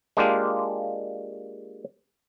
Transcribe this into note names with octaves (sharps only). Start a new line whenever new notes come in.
G#3 A#3 D4 F4 G4